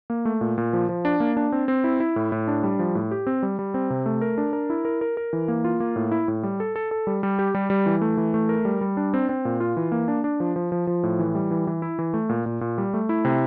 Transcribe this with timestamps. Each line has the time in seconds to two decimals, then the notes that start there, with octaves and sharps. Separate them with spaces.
0.10 A#3
0.25 A3
0.41 A#2
0.58 A#2
0.73 F3
0.89 F3
1.05 D4
1.20 A#3
1.37 D4
1.52 C4
1.68 C4
1.84 E4
2.00 E4
2.16 A2
2.32 A2
2.48 D4
2.63 G3
2.79 F3
2.95 A2
3.11 G4
3.27 C4
3.43 G3
3.59 G3
3.74 C4
3.90 C3
4.06 A3
4.21 A#4
4.38 D4
4.53 A#4
4.70 E4
4.85 A#4
5.01 A#4
5.17 A#4
5.33 E3
5.48 A#3
5.64 F4
5.80 A#3
5.96 A2
6.12 E4
6.28 A2
6.43 G3
6.60 A4
6.76 A4
6.91 A4
7.07 G3
7.23 G3
7.39 G4
7.55 G3
7.70 G3
7.86 E3
8.02 A3
8.17 E3
8.34 A3
8.49 A#4
8.65 G3
8.81 G3
8.97 D4
9.14 C4
9.29 C4
9.45 A#2
9.60 F4
9.77 E3
9.92 A#3
10.08 D4
10.24 D4
10.40 F3
10.56 F3
10.72 F3
10.87 F3
11.03 A2
11.19 E3
11.35 G3
11.51 E3
11.67 E3
11.82 E4
11.99 E3
12.14 A3
12.29 A#2
12.46 A#2
12.61 A#2
12.78 G3
12.94 A3
13.09 E4
13.25 C3